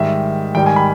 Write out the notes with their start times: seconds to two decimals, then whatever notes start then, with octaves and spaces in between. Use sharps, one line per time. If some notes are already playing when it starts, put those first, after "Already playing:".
Already playing: G#2 D#3 G3 E5
0.55 G#2 D#3 G3 G5
0.66 G#5
0.76 B5